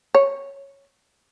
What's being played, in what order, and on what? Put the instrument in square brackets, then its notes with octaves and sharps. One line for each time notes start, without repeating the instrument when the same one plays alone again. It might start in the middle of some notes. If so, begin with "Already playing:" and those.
[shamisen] C#5